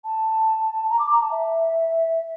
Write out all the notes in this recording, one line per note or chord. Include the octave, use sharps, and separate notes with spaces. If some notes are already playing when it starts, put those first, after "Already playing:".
A5
A#5
D6
A#5
A5
E5